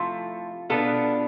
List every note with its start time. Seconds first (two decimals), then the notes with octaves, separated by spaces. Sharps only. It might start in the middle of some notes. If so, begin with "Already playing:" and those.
Already playing: C3 F3 A3 E4 F4 A4
0.70 B2 B3 D4 F4 A4